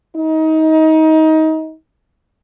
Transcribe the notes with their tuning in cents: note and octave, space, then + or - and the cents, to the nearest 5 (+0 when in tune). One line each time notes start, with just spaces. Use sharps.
D#4 +25